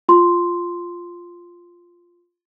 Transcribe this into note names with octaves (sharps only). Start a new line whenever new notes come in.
F4 C6